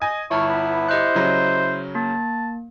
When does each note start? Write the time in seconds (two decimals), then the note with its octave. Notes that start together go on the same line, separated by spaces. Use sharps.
0.02 D#5 G#5
0.31 G1 E4 C#5 A5 C#6 F6
0.49 B3
0.89 G4 C5 D#5 F#6
1.15 C#3 F#3 C#4
1.95 A#3 A5